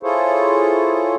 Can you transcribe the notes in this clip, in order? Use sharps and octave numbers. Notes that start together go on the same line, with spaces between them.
E4 F4 G#4 A4 C5 C#5